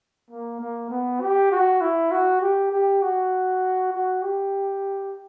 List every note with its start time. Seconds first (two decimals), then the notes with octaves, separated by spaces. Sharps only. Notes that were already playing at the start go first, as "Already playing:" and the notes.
0.31 A#3
0.61 A#3
0.91 B3
1.21 G4
1.52 F#4
1.81 E4
2.12 F#4
2.41 G4
2.72 G4
3.02 F#4
3.93 F#4
4.22 G4